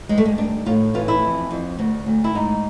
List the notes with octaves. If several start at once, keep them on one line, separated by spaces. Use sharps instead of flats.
G2 G#3
A3
G#3
D#3 D4
A2 F4
E3 F4
E4
F2
F2
D2
D2
E4
G#2 D#4